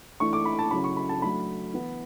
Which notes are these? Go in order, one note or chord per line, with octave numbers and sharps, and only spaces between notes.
E3 A3 D4 C#6
D6
B5
A5
C#3 F#3 C#4 E4 B5
C#6
B5
A5
F#3 A3 D4 B5
E3 B3 E4